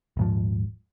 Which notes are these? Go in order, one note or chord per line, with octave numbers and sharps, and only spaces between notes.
D#1 G#2 F3